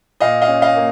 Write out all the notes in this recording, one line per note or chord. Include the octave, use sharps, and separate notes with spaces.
A#2 D#5 F5
D#5 F5
C#4
D#5 F5
A#3